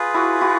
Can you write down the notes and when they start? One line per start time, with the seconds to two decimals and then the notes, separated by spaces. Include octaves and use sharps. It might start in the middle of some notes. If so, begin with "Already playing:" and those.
Already playing: F4 G#4 B4
0.14 E4 F#4
0.41 E4 F#4